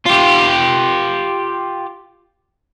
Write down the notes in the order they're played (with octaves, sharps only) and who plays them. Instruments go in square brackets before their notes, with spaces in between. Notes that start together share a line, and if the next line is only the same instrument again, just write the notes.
[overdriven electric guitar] F4 G4